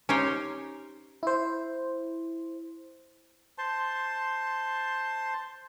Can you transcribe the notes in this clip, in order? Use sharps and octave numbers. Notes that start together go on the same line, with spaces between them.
C#4 D#4 G4 C5 C#5
E4 C5
C5 A5 C6